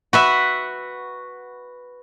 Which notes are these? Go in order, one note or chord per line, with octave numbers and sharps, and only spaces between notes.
F#4 B4 E5